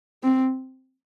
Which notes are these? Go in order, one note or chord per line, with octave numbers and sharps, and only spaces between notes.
C4